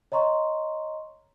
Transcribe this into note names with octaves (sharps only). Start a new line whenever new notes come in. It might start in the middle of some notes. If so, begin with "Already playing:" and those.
C#5 D#5 A#5 C6 C#6